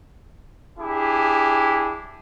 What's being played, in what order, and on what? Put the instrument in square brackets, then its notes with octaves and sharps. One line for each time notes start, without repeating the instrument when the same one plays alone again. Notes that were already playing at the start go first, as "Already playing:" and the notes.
[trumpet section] D4 E4 G4 G#4